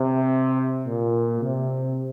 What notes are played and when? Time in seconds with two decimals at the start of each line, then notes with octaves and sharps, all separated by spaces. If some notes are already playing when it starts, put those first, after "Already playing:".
Already playing: C3
0.86 A#2
1.42 C3